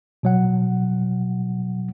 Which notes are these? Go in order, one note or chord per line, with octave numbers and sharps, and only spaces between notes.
B2 F#3 F#5